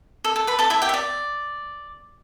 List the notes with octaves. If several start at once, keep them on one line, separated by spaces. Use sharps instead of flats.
A4
A4
B4 B5
A4 A5
E4 E5
G4 G5
E5
D5